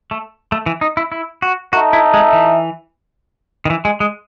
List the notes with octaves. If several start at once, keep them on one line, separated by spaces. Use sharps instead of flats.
A3
A3
E3
D#4
E4
E4
F#4
D#4 F#4 A4 E5
E4
G#3
E3
D#3
E3
G#3
G#3